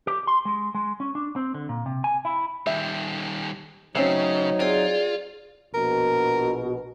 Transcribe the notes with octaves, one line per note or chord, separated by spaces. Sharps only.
G4
C6
G#3
G#3
C#4
D4
C4
D3
A#2
C3
G#5
E4
D#3 G3 E5
C#3 F#3 A3 C4 C#4 D#4
C4 F4 G#4 D5
A#1 B2 A#4